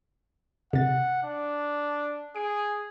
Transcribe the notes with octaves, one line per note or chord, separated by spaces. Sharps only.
C3 F#5 A6
D4
G#4 D7